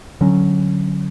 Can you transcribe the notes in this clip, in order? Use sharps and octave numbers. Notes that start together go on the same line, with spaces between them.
D3 F#3 C#4